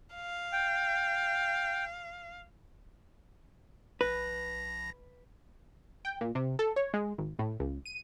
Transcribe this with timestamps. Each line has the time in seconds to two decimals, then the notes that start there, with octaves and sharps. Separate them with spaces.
0.15 F5
0.52 G5
4.01 A#1 B4 A#6
6.05 G5
6.21 A#2
6.35 C3
6.59 A4
6.76 C#5
6.94 G#3
7.18 G#1
7.39 A2
7.60 C#2
7.86 D#7